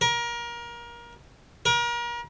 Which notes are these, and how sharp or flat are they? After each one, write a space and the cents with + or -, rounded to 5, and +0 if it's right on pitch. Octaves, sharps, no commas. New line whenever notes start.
A#4 +25
A#4 +35